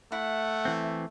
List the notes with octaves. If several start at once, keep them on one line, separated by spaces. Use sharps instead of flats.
A3 E4 F#5
E3 C4